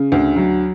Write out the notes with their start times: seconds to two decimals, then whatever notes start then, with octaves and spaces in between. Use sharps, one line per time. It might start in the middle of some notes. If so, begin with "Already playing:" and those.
Already playing: C#3
0.12 D2
0.36 F#3